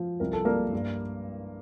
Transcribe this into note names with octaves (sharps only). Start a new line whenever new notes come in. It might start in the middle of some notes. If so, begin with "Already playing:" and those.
Already playing: F3
C2 A#4
A4
G3 A#3 A#4
G2